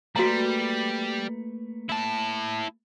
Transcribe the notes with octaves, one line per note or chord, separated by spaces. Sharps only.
G3 A3 A#3 F#4 B4 A#5
E4 A5